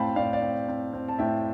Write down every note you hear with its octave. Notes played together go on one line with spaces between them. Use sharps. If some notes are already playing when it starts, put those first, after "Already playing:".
Already playing: A2 C4 F5 G5 A5 B5
A2 D5 F5
D5 F5
C4
C4
C4
A5
A2 E5 G5